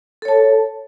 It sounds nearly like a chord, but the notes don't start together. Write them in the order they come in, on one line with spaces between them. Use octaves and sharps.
A4 C#5 A5